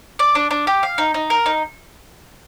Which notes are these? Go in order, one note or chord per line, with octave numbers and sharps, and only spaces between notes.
D5
D4
D4
G4
F5
D#4
D#4
A#4
D#4